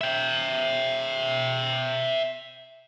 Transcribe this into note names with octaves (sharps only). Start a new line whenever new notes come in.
E5 G5